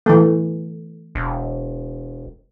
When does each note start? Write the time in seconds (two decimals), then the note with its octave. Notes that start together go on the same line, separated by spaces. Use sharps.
0.06 E3 A3
1.15 E1